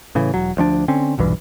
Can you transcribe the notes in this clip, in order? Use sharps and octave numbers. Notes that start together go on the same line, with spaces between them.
A2 C#3 E3
E1 F#3
D2 F3 C#4 D4
D3 C4 C#4
D#1 B1 G2 E3